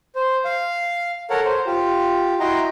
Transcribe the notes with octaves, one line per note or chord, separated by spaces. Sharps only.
C5
F5
A4 A#4 C#5 F#5
C5
F4 G4
E4 F#4 D#5 G5 A#5 C6